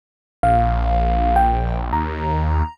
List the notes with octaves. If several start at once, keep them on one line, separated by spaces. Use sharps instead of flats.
A#1 F5
G5
D#2 A#5